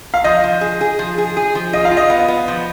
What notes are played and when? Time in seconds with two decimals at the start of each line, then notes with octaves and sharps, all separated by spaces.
0.14 F5
0.24 F3 D#5
0.44 F3
0.61 G#4
0.81 G#4
0.99 F3
1.18 G#4
1.37 G#4
1.55 F3
1.73 F4 D#5
1.85 F5
1.91 F4
1.97 D#5
2.10 B3
2.28 B3
2.48 F3